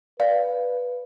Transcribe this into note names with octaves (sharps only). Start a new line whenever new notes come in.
B4 D5 F5